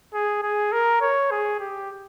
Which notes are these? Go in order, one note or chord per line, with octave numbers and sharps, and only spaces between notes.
G#4
G#4
A#4
C#5
G#4
G4